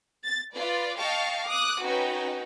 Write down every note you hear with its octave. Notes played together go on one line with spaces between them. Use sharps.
A6
F4 B4 D5
D#5 F5 G5 A5 C#6
D6 D#6 F#6
C#4 D#4 F#4 B4 G5